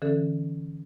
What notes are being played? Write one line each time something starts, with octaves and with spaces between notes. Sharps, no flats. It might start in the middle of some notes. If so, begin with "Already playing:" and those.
D3 E3 C#4 A4